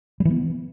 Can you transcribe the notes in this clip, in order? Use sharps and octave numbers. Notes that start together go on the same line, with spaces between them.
G3
E3
B3